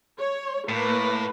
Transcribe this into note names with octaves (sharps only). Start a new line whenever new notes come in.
C#5
A2 A#3 B4